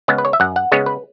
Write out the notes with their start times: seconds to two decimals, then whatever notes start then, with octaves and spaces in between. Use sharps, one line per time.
0.08 C#3 G#3 B3
0.18 B4
0.25 C#5
0.33 E5
0.40 F#2 F#5
0.56 F#5
0.72 C#3 G#3 B3 C#5
0.86 B4